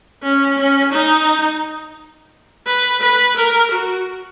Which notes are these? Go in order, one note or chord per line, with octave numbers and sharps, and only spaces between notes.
C#4
C#4
D#4
B4
B4
A#4
F#4